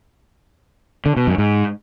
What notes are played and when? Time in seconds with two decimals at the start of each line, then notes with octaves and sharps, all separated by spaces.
1.06 D3
1.17 B2
1.27 F#2
1.38 G#2